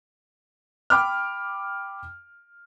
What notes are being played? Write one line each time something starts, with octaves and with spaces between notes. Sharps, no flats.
G5 B5 D6 F6